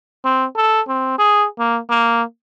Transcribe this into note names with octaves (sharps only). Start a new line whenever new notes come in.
C4
A4
C4
G#4
A#3
A#3